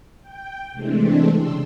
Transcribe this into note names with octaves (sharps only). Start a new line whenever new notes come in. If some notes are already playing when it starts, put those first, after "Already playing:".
G5
C3 E3 G#3 A3 C4 D4
C#3 D4 C6 E6